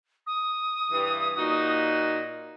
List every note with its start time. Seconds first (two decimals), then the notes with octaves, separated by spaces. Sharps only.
0.27 D#6
0.92 G2 E3
1.37 A#2 D#4 F#4